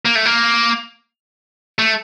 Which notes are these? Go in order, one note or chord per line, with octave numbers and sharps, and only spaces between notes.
A#3
A3
A#3
A3